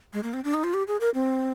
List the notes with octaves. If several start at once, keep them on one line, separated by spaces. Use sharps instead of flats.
G#3
A#3
C4
D4
D#4
F4
G4
G#4
A#4
C4